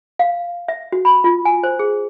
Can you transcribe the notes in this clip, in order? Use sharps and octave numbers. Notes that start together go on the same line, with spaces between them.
F5
E5
F#4
B5
F4
G#5
C5
G#4